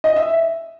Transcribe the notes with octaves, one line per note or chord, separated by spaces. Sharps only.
D#5
E5